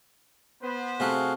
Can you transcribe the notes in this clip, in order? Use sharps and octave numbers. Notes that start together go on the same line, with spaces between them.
B3 B4 C5
C3 A3 F#4 G#4 F5